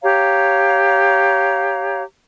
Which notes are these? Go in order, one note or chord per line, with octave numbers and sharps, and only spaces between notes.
G4 C#5 F5 A#5